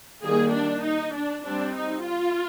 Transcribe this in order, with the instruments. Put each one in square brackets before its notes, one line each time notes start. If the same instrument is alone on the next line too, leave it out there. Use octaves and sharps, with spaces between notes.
[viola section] D#3 G3 A#3 G#4
D4
D#4
D4
G3 C4 D4
D#4
F4